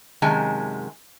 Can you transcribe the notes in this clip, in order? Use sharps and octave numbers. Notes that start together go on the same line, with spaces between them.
F#2 C3 D#3 G#3 G#5 A5